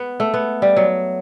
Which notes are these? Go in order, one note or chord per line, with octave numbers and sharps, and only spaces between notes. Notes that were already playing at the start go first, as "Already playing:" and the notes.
Already playing: B3
A3
B3
G3
F#3